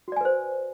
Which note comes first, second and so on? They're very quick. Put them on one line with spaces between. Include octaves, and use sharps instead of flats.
F#4 D5 G#5 B4 C5